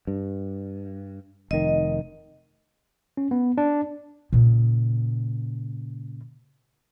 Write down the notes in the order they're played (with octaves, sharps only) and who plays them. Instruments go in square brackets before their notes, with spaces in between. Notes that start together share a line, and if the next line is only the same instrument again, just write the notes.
[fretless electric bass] G2
[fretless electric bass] F1 D#3 [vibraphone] D#5
[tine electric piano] C#4
B3
D4
[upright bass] A#2 C#3